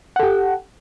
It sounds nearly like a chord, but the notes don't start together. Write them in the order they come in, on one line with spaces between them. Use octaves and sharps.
F#5 A4 G4